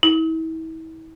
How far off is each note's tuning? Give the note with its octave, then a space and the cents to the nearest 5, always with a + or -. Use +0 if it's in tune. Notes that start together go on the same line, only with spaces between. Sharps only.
E4 -40